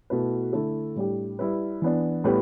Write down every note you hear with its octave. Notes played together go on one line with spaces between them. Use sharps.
B2 A3 E4 B4
D3 A3 E4 A4
A2 G3 D4 G4
G3 E4 B4
E3 B3 D4
A2 G3 B3 G4 B4